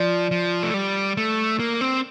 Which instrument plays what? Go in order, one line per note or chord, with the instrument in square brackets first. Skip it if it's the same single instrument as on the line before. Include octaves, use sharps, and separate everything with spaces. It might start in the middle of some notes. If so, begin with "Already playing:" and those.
Already playing: [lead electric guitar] F3 [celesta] D5
[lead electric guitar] F3
A3
G3
A3
A#3
C4